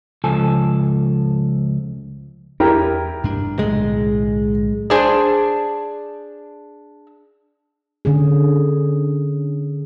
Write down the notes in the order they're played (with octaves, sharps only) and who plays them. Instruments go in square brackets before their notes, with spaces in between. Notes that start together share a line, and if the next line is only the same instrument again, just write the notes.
[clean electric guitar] C#2 F3 A4 G#5
[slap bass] E2 [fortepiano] E4 G4 A#4
[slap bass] G2 D4
[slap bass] B1 A2 D3 [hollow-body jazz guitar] G#3
[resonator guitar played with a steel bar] D4 G#4 C5
[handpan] D3 C#4 G#4